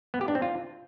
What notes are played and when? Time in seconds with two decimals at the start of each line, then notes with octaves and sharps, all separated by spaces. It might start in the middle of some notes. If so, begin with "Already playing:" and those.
0.14 B3
0.21 G4
0.28 D4
0.35 C4
0.42 F4